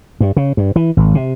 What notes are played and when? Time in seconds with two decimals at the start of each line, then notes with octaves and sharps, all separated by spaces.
0.20 G2
0.37 C#3
0.57 G2
0.76 E3
0.97 G#1
1.15 C3